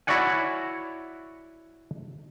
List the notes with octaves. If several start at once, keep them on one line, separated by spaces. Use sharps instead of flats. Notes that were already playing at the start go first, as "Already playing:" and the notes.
E4 F#4 C#5 D5 F#5 G#5